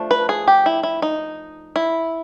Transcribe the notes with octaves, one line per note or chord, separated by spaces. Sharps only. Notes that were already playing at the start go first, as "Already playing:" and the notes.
Already playing: F3 A3 D4
B4
G#4
G4
E4
E4
D#4
E4